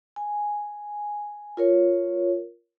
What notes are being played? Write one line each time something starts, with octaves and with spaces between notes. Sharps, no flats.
G#5
F4 A#4 C#5